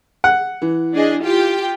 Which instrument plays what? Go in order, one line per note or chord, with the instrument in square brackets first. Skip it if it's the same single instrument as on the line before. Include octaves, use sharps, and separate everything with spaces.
[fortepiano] F#5
[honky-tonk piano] E3
[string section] D4 G#4 D#5
F4 G4 G5